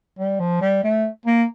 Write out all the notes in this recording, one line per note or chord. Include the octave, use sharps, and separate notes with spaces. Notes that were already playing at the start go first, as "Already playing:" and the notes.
G3
F3
G3
A3
A#3